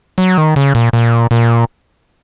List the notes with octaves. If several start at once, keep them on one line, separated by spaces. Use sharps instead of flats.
F#3
D#3
C#3
A#2
A#2
A#2